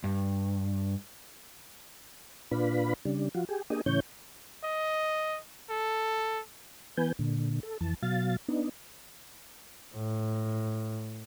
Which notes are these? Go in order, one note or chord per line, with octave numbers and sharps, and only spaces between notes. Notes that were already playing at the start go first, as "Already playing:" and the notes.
G2
A#2 D4 F4 B4 B5
C#3 G3 D4
F3 F4 F#4
G4 G#4
A#3 D4 G4 G#4 D#5
A2 C#3 E3 C#4 C#5 G6
D#5
A4
E3 B3 B4 G#5 G6
A#2 D3
A4
F2 E3 A5
B2 F#3 F5 A6
B3 D4 D#4
A2